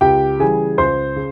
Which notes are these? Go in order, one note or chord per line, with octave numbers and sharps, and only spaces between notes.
C#2 G4 G5
C#3 E3 G3 G#4 G#5
C#2 C5 C6
C#3